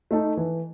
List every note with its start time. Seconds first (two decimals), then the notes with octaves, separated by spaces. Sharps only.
0.11 A3 D#4 A4
0.37 E3